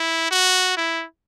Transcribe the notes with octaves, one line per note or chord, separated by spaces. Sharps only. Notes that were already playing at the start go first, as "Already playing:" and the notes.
Already playing: E4
F#4
E4